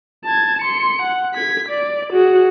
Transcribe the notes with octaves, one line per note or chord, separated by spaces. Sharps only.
A5 G#6
C6 C#7
F#5
G#6 B6
D5
F#4 G#4